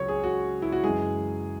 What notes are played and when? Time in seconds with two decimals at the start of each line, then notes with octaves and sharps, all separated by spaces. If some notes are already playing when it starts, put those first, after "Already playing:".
Already playing: C#2 F#3 C#5
0.08 G#4
0.24 F#4
0.62 E4
0.72 F#4
0.84 F#2 E3 G#3 G#4